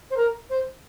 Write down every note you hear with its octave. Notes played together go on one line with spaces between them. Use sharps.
C5
A#4
C5